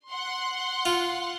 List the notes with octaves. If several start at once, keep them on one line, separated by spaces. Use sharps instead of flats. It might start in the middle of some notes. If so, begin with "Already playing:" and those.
F#5 C6
F4